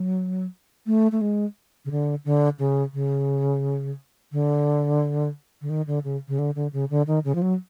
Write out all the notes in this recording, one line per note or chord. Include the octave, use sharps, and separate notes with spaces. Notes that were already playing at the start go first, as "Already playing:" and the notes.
Already playing: F#3
A3
A3
G#3
C#3
D3
D3
C#3
C#3
D3
D3
D#3
D3
C#3
C#3
D3
D3
C#3
D3
D#3
C#3
F3
F#3